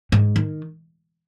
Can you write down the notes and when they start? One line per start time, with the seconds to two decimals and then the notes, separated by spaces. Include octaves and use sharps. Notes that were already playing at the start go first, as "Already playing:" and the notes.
0.12 G#2
0.36 D#3